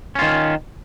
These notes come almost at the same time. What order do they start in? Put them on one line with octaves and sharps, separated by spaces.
C#4 F4 D#3